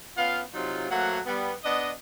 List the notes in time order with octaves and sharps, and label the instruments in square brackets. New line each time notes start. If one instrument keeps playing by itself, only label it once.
[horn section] B3 C#4 F4 F5
C3 F#3 D#4 F4
F#3 A3 A#3 C5 F#5
G3 B3
B3 D4 D#5